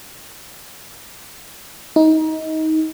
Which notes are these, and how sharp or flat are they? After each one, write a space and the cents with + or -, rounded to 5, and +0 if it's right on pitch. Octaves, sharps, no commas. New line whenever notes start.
D#4 +20